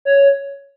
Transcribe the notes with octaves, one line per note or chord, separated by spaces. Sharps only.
C#5